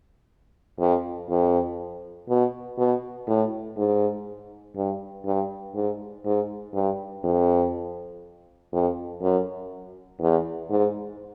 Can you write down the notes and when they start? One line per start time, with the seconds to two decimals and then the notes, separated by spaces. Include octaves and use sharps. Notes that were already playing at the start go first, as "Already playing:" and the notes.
0.79 F2
1.30 F2
2.29 B2
2.78 B2
3.27 A2
3.77 G#2
4.76 G2
5.25 G2
5.75 G#2
6.25 G#2
6.74 G2
7.24 F2
8.73 F2
9.22 F#2
10.21 E2
10.70 G#2